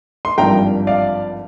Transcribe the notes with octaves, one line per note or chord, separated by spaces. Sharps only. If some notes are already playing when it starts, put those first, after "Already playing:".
C6
G#1 G2 F3 A#3 G5 A#5
D5 F5